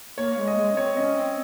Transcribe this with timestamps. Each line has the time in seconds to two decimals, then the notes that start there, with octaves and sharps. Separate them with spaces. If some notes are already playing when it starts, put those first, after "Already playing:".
0.18 A#3 C#5
0.37 G#3
0.47 D#5
0.57 G#3
0.72 C#4
0.77 C4 C#5
0.97 C#4 D#5
1.17 C4